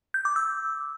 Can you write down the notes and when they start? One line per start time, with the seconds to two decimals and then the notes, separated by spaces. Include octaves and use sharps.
0.14 G6
0.25 D6
0.36 E6